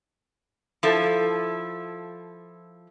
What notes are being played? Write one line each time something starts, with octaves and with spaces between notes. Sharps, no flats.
F3 E4 A4